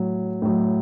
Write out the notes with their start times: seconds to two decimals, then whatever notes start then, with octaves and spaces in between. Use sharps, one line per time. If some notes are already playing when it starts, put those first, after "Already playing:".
Already playing: A2 F#3
0.42 A2 F#3